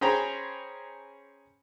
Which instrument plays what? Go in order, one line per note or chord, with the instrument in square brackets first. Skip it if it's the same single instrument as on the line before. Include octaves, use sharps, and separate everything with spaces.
[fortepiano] C#4 G#4 C5 G5 A#5 B5